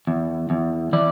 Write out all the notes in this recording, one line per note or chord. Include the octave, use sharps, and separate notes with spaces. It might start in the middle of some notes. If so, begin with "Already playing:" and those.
E2
E2
E3 D5